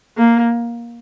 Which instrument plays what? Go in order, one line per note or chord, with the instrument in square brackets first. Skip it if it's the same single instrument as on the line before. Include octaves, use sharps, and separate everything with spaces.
[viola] A#3